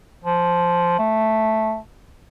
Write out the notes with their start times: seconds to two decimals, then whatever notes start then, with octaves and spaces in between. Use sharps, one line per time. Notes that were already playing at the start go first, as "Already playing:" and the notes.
0.24 F3
0.99 A3